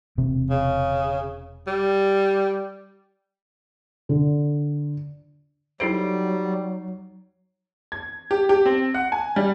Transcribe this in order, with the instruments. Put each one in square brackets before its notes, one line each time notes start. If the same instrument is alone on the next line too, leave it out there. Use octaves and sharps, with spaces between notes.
[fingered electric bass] E1 C3 C4
[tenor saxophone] C#3
G3
[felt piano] D3
[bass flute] F#3 [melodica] G3 [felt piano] D#4 C7 D7 [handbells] E4 A4 C5
[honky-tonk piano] G#6
G4
G4
C4
F#5
G#5
G3